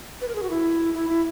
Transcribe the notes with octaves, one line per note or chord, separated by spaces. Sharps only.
B4
A#4
G#4
F#4
E4
E4
E4